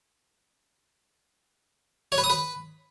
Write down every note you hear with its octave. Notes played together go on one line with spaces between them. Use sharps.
C#5
B4
D#6
B4